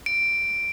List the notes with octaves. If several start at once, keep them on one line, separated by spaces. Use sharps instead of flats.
D7